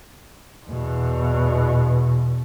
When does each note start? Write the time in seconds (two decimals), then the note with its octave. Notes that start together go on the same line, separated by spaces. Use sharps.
0.66 E2 B2